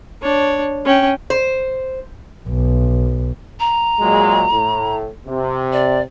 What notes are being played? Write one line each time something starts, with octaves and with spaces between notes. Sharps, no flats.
D4 C#5
C#4 G5
C5
B1
A#5
A#2 F#3 G#3
A2
C3
D5